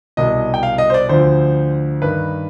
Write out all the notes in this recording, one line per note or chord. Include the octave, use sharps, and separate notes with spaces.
C2 B2 D#5
G5
F5
D#5
C5
D5
D2 D3 F3 C5
G2 D#3 B4